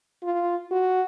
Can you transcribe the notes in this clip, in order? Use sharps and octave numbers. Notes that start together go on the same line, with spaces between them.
F4
F#4